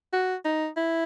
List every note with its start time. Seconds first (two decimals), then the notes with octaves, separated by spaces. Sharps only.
0.13 F#4
0.45 D#4
0.76 E4